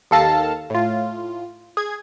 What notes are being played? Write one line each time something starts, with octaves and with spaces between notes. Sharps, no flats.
D#2 D#3 A4 F5 A5 A#6
A2 F4
G#4 G#6